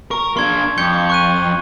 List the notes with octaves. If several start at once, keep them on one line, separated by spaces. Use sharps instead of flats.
A#4 C#6
A#3 D4 C6 G#6
F2 G6 C#7 G7
C#6 F#6 D#7